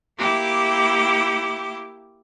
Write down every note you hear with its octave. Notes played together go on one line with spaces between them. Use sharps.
A#3 E4 G4 G5 D6